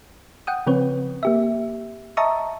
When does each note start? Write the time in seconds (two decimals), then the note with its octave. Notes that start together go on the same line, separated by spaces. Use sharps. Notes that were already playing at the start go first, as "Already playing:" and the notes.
0.47 F#5 G5 D#6
0.67 C#3 F3 C4 B4 C#5
1.23 A#3 G4 E5
2.17 D#5 E5 A5 A#5 C#6 D#6